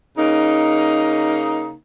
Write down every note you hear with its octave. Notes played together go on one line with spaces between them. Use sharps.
C#3 A#3 D#4